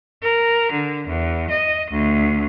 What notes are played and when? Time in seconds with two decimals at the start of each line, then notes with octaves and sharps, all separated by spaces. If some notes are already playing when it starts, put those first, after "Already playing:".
0.21 A#4
0.71 D3
1.06 E2
1.50 D#5
1.91 D2